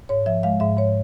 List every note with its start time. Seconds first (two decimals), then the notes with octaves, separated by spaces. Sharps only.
0.09 G#2 C#5
0.26 F3 E5
0.43 G#3 F5
0.60 G#2 E5
0.77 G#2 C#5